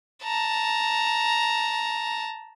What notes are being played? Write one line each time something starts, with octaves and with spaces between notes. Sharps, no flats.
A5 A#5